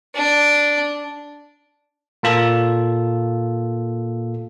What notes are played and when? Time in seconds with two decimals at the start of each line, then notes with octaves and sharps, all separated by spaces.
0.15 D4
2.23 A#2 A#3 F4 A4